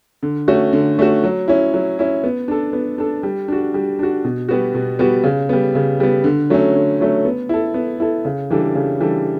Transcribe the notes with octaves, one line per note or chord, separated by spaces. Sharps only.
D3
A3 C#4 F#4
D3
A3 C#4 F#4
F#3
C#4 E4
F#3
C#4 E4
B3
D4 A4
B3
D4 A4
G3
D4 F#4
G3
D4 F#4
B2
G3 B3 F#4
B2
G3 B3 F#4
C#3
G3 B3
C#3
G3 B3
D3
F#3 A3 C#4
D3
F#3 A3 C#4
B3
E4 A4
B3
E4 A4
C#3
E3 G3 D4 A4
C#3
E3 G3 D4 A4